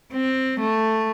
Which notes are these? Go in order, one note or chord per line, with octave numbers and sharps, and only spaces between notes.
C4
A3